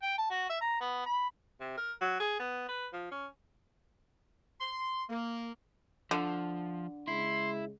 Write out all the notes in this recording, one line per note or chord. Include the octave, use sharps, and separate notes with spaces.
G5
A5
F#4
E5
A#5
B3
B5
C3
A#4
F#3
G#4
B3
B4
F3
C#4
C6
A#3
D3 F3
C#3 G#3 E4 C6